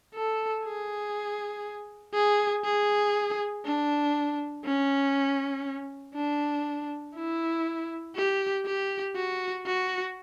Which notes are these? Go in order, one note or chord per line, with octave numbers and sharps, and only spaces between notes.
A4
G#4
G#4
G#4
D4
C#4
D4
E4
G4
G4
F#4
F#4